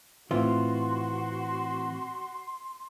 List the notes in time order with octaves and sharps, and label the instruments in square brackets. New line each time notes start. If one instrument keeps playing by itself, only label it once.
[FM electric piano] A2 C4 [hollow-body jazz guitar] E3 F4 [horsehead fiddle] F#4 [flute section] C6